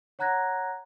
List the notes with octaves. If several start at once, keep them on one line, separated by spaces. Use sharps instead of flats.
C#5 F#5 A#5 F#6 G#6 A#6